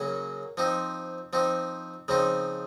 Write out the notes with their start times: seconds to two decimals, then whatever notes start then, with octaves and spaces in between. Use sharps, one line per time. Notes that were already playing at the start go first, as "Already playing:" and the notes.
Already playing: C#3 F#3 A#3 C#4
0.57 F3 C4 D#4
1.33 F3 C4 D#4
2.08 C#3 F3 C4 D#4